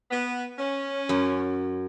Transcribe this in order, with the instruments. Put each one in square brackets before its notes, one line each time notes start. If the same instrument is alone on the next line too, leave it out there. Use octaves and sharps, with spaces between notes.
[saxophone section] B3
C#4
[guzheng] F#2